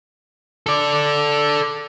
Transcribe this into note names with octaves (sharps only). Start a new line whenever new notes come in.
A4 D5